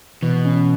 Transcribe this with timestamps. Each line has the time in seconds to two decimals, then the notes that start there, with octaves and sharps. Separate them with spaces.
0.22 B2 E3
0.45 C#4